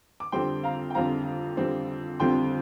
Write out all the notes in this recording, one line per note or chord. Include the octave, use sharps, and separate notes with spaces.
D6
F2 D3 G3 C4 G5 C6
F5 A#5
G5
F2 D3 G3 C4 F5 A#5
F2 D3 G3 C4
F2 D3 G3 C4 G5 C6